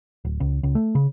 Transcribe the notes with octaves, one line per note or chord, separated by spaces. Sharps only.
D1
C#2
C#2
A3
C#3